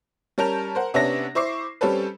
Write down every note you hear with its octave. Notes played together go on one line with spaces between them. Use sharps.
G3 C#4 A#4 A5 G6 F7
A#4 C5 F#5
C3 B3 C#4 D4 E5 A#6
E4 C5 C#6 D6 C7
G3 C4 C#4 G4 A4 B4